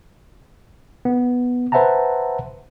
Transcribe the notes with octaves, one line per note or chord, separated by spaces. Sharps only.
B3
B4 C5 E5 F#5 A5 A#5